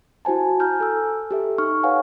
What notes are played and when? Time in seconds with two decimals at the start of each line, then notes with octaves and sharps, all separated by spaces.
0.25 E4 F#4 C5 G#5 A5
0.60 G#5 A#5 F6 G6
0.80 A4 E6
1.31 G4 A4 E5
1.58 D#4 C#6 F6
1.83 B4 C#5 F5 F#5 G#5